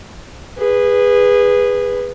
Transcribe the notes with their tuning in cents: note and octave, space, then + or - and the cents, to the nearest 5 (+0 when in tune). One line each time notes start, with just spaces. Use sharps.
G#4 -20 B4 +0